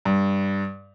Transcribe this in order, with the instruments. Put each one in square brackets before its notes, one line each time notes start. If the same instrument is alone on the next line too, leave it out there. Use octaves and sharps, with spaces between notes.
[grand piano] G2